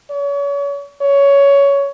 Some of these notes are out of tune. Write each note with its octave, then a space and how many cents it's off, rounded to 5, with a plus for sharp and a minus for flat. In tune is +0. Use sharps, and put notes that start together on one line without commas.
C#5 +35
C#5 +15